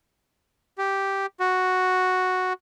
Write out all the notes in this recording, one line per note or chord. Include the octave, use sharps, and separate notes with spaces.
G4
F#4